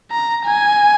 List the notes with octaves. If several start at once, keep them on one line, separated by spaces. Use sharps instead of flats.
A#5
G#5